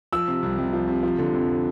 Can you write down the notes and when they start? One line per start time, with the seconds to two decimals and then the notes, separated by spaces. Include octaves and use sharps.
0.13 F3 E6
0.28 C3
0.43 C2
0.58 C2
0.73 F3
0.88 C3
1.03 F3
1.19 D3
1.34 F2